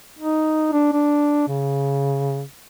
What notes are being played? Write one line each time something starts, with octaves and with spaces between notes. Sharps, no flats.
D#4
D4
D4
C#3